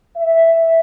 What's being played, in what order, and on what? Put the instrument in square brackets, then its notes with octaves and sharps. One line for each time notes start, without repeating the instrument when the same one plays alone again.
[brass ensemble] E5